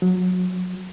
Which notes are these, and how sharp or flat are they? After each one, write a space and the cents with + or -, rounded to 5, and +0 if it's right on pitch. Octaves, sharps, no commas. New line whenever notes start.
F#3 -20